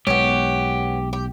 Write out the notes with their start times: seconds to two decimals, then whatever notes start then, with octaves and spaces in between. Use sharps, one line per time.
0.07 B1 G#3 B3 C#4 G4
1.13 G4